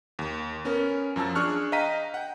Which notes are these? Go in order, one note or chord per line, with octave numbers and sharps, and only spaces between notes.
D#2
B3 C#4 A#4
F#2 F3 A5 E6
D4 G#4 C#6 F6 F#6
D#5 F5 G5 A#5 B6 D#7
F#5 G5